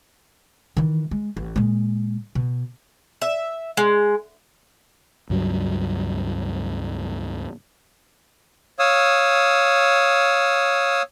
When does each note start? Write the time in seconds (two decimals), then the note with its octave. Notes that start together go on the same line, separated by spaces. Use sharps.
0.77 D#3 E3
1.11 G#3
1.37 A1
1.56 A#2 G#3
2.35 B2
3.22 E5
3.77 G#3
5.30 C#2 G2 F#3
8.79 C#5 F5 D#6 E6